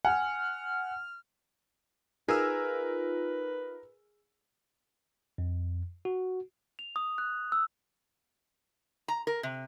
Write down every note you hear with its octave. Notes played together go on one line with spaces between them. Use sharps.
F#5 G#5 F6
D#4 F4 G#4 A#4 B4 E6 F6
F2
F#4
F7
D#6
F#6
E6
A#5
A#4
C3